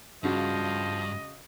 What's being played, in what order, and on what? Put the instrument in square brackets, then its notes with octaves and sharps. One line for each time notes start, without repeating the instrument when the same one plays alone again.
[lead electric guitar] G2 [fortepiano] C#3 F#4 [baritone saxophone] F3 [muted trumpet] D#5